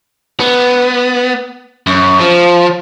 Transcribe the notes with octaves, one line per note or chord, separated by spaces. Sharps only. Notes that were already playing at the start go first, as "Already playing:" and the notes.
B3
F#2
F3